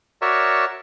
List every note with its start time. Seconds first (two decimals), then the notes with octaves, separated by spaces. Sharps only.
0.22 F#4 A#4 C#5 D5 E5